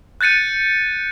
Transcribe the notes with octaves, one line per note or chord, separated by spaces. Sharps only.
F#6 G6 A6 C#7 D#7